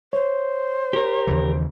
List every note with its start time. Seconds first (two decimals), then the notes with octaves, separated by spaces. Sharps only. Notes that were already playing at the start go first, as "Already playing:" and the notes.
0.13 C5 C#5
0.93 G4 A#4
1.27 D#2 C#3 E3